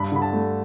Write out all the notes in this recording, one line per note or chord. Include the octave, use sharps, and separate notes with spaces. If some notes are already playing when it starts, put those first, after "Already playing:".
Already playing: G2 B5
D3 B5
A5
A3